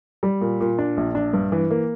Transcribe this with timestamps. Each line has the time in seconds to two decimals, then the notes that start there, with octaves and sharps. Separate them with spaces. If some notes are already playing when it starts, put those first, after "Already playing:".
0.23 G3
0.41 A#2
0.60 A#2
0.78 D4
0.97 A#1
1.15 D4
1.33 G2
1.52 E3
1.71 A#3